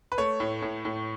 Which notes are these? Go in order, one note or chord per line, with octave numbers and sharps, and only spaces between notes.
B4
A3 C#5
A2
A2
A2